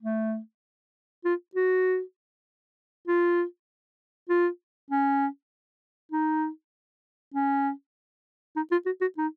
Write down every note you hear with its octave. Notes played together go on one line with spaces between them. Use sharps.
A3
F4
F#4
F4
F4
C#4
D#4
C#4
D#4
F4
F#4
F#4
D#4